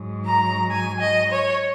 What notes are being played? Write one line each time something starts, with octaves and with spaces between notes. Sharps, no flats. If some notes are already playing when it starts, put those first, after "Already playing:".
Already playing: G#2 F#3
A#5
G#5
D#5
C#5